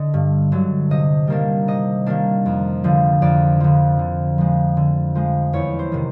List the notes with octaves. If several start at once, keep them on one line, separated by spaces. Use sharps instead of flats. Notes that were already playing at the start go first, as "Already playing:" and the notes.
Already playing: D3 D#5
G2
D3 F#3
C3 D#5
D#3 G3 A#3 D4
C3 D#5
D#3 G3 A#3 D4
F2
D3 F3
F2 D5
D3 F3
D3
F3 G#3
D3
F3 G#3
E2 C#5
C5
C3 D#3